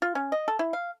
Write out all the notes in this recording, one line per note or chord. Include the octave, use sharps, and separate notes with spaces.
F4
C#4
D#5
A4
E4
F5